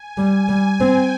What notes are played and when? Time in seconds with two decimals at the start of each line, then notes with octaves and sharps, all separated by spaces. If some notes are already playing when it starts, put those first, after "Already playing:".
Already playing: G#5
0.18 G3
0.49 G3
0.80 C4 G5